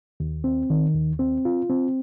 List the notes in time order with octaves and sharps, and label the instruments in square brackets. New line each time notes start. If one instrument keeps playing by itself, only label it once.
[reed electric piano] D#2
C4
D#3
D#2
C4
F4
C4